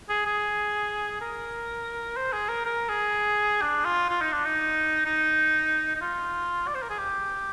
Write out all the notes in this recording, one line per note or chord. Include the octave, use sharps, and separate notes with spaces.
G#4
G#4
A#4
C5
G#4
A#4
A#4
G#4
D4
F4
F4
D#4
D4
D#4
D#4
D#4
F4
D5
C5
A#4
G#4
G4